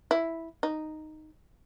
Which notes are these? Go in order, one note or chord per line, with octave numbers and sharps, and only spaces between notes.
E4
D#4